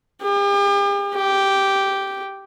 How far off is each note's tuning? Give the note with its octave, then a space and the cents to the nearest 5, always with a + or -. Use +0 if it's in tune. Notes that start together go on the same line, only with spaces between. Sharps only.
G4 +45
G4 -5